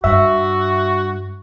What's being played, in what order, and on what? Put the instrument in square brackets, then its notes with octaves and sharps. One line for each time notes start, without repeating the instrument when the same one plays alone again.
[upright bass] G2 [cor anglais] F#4 [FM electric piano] E5